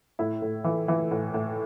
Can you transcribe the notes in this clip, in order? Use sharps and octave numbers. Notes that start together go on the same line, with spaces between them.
A2 E4
A2
E3
E3
A2
A2